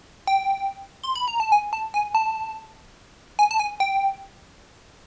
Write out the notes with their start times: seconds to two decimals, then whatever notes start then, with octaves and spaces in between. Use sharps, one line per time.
0.27 G5
1.03 C6
1.15 B5
1.28 A#5
1.40 A5
1.52 G#5
1.73 A5
1.94 G#5
2.15 A5
3.39 G#5
3.51 A5
3.59 G#5
3.80 G5